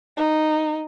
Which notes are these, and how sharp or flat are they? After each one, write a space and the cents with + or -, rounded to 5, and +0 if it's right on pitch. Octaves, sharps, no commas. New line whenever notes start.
D#4 -5